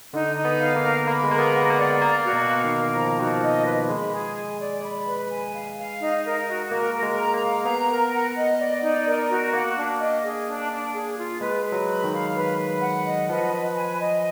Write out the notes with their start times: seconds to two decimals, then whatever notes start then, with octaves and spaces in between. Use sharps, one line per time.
0.13 D3 D#4
0.37 D#4
0.45 B3
0.60 F5
0.76 A#3
0.84 A#4
1.07 A#3 B5
1.23 G#3
1.31 A#3 A#4
1.39 B3
1.54 F#5
1.70 A#3
1.78 D5
2.01 A#3 A#5
2.25 F#4
2.33 B2
2.48 F5
2.64 D#3
2.72 A#4
2.95 F3 A#5
3.19 D#3 F#4
3.27 F3
3.43 D#5
3.66 B4
3.89 G#3 B5
4.12 G#4
4.36 G#5
4.60 D5
4.83 B5
5.07 B4
5.30 G#5
5.54 F5
5.78 F5
6.01 D#4
6.24 A#4
6.48 F#4
6.71 A#3 A#4
6.95 A#4
7.03 G#3
7.18 A#5
7.34 A#3
7.42 F5
7.65 B3 A#5
7.89 A#4
8.13 F#5
8.36 D#5
8.59 D5
8.82 D#4
9.06 A#4
9.29 F#4
9.53 A#3 F#5
9.77 D4
10.00 D#5
10.24 G#4
10.47 D4
10.70 D4
10.94 G#4
11.18 F4
11.41 G#3 B4
11.65 B4
11.72 F#3
11.88 B5
12.04 D#3
12.11 F5
12.35 B4
12.58 B4
12.82 F#5
13.05 D#5
13.29 F3 B4
13.52 B4
13.76 G#5
13.99 D#5